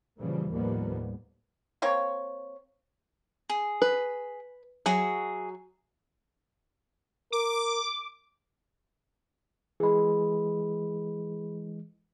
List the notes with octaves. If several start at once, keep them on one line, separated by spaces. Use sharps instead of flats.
A#2 C#3 E3 F3 G3
D#2 A2 F3 G3 A#3 B3
A#3 C4 C#5
G#4
B4
F#3 F#4 G#4 E5
A#4 D6
E3 G#3 G#4 B5